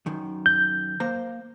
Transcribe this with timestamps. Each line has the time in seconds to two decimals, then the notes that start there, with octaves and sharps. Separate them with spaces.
0.06 F#2 D#3
0.46 G6
1.00 A#3 C5 A#5